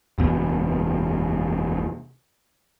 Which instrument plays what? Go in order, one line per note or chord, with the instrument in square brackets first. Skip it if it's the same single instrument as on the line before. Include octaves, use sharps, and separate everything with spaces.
[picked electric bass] F#1 E2 B2